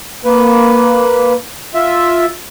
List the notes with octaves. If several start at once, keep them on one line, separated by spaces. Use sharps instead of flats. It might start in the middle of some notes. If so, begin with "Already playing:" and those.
A#3 B4
F4 E5